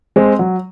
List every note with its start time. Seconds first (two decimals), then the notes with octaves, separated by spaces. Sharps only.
0.16 G#3 C4
0.39 F#3